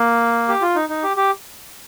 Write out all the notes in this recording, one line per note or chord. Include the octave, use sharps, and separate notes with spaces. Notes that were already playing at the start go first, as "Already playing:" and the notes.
Already playing: A#3
G4
F4
D#4
D#4
G4
G4